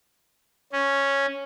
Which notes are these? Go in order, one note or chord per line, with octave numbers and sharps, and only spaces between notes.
C#4